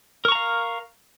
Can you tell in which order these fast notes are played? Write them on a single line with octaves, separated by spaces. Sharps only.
A#4 C#6 A#5 F5